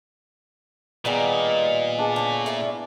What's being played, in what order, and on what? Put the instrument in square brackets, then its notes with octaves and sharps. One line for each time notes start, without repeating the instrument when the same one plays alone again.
[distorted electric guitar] A#2 [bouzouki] D#3 G3 D#4 [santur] B3 G#4
[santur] D4 G#4 D#5
[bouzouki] D3 C#4 [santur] D4
[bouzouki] A2 E4 D5